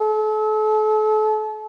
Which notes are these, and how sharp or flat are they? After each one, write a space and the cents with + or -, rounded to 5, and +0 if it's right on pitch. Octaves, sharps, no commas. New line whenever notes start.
A4 -35